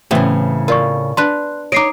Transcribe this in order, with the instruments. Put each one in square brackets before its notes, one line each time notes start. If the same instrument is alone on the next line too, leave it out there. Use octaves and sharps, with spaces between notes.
[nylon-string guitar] A2 C#3 [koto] E3 B3 C4
[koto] F4 [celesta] A#4 D5 C#6
[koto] D4 B4 [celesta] C6 F#6
[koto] D#4 D#5 [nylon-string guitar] C#5 [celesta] D6 C7 D7